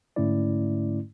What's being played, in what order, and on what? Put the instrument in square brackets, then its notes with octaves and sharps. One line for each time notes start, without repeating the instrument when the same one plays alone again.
[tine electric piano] G#2 D3 A3 C#4 E4 D5